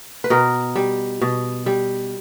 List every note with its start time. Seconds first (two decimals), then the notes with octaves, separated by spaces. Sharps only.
0.24 B4
0.30 B2 A#4
0.76 G3
1.21 B2
1.66 G3